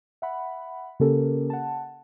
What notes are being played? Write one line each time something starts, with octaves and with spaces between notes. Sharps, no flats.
E5 F#5 B5
C#3 A#3 C#4 G4 A4 A#4
F#5 A5